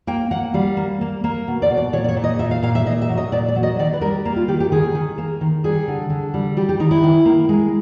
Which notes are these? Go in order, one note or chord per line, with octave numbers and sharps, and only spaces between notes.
A#3 G5
A#3 F#5
G3 F5
A#3
A#3
A#3
B2
D5
B2
D5
A#2 C#5
D5
C#5
A#2
D#5
A#2 E5
F5
A#2 F5
E5
A#2 D#5
E5
F#3
D#5
A#2 D5
D5
F#3
D#5
D#3 D5
B4
G3 A#4
A#3
F4
D#3 G4
G4
D#3 G#4
D#3
A#3
D#3
G3 G#4
D3
D3
G3
G3 G4
G4
D#3 D#4
E4
D#3
A#3
G#3